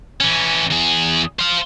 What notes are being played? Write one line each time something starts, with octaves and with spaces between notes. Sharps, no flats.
E3 C#4
E2 G#4
C5 F5